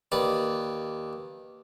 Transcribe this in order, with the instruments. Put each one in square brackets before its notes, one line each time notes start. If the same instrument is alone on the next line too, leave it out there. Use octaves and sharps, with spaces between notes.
[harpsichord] D#2 B4 D5